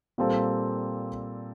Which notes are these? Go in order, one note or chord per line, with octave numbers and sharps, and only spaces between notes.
A#2 G3 C4 F4 A4